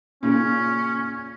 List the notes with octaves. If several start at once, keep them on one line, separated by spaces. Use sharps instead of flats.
A#2 C#3 C#4